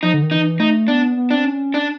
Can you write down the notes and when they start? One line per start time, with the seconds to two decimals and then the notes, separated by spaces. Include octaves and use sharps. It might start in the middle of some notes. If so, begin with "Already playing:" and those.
0.03 F3 D#4
0.14 D3
0.23 D#3
0.31 E3 D#4
0.60 A3 D#4
0.88 B3 D4
1.17 B3
1.31 C4 D4
1.45 C#4
1.74 D4